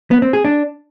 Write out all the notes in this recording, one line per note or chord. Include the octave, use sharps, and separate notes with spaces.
B3
C4
G#4
D4